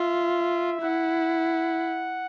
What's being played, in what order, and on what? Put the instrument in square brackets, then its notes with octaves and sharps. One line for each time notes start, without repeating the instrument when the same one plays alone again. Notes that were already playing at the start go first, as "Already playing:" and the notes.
Already playing: [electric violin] F4 [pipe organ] E5
[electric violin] E4 [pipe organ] F#5